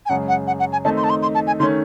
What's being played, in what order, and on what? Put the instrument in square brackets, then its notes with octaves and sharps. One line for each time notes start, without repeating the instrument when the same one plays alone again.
[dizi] G#5
[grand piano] F#2 C#3 G#3 [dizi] F#5
[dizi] F#5
F#5
F#5
G#5
[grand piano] D#3 A3 C4 D#4 [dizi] A5
[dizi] C6
A5
C6
C6
A5
G#5
[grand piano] D#3 A3 C#4 [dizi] C6